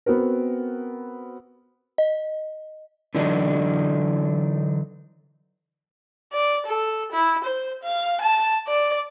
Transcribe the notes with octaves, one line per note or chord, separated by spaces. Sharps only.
B3 C4 F#4 A#4
D#5
D3 E3 F#3 D4 D#4
D5
A4
E4
C5
F5
A5
D5